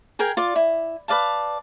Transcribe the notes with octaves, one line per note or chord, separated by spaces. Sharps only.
G#4 A#4 G5 G#5
F4 D5
E4
B4 D5 F5 A5